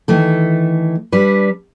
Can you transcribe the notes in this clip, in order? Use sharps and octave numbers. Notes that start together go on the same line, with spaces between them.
D#3 E3 A3 A4
G3 D4 B4